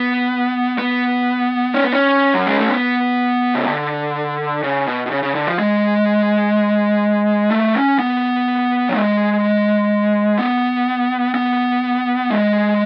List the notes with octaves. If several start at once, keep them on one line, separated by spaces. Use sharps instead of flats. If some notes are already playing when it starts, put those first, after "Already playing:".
Already playing: B3
B3
C#4
B3
C#4
F#3
G#3
A3
B3
C#3
D3
C#3
B2
B2
C#3
C#3
D3
F3
G#3
A3
C#4
B3
F#3
G#3
B3
B3
G#3